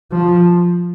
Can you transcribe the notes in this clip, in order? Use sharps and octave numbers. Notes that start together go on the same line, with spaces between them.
F3